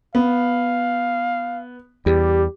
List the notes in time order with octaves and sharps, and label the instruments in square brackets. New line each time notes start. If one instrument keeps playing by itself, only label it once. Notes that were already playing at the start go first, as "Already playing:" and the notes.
[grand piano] B3 [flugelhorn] F5
[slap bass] E2 [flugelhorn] G3 [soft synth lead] G4